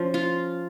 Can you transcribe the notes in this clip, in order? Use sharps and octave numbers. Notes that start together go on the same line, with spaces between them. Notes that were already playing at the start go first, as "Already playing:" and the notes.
Already playing: F3 C#4
F4